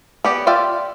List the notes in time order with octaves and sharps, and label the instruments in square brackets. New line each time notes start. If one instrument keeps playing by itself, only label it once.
[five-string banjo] B3 G4 D5
F4 D5 E5 G5